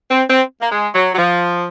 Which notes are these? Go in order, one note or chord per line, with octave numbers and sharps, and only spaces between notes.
C4
C4
A#3
G#3
F#3
F#3
F3